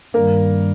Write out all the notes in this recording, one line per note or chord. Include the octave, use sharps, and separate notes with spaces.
G2 D#3 G3 A#3 A#4